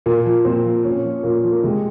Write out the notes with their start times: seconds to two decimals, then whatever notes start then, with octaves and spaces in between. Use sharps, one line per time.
0.06 A#2 A#3
0.25 F3
0.44 A#2 C4
0.65 F3
0.84 A#2 C#4
1.04 F3
1.23 A#2 A#3
1.43 F3
1.52 A#3
1.63 C3 G#3